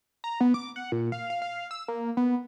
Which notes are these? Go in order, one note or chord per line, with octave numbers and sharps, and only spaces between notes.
A#5
B3
D6
F#5
A#2
F5
F5
F5
E6
A#3
B3